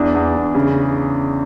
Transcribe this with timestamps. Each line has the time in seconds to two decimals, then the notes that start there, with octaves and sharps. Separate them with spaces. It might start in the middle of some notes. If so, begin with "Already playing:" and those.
Already playing: E2 D4
0.14 E2
0.34 E2
0.54 C#3